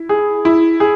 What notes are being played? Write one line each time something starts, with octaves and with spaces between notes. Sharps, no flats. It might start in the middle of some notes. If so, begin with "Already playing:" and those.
Already playing: E4
G#4
E4
G#4